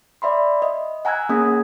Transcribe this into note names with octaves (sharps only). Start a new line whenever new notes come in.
D5 E5 B5 C6
D#5
F#5 G#5 A#5 E6 F#6 G#6
A#3 C#4 G#4 D#6 G#6 B6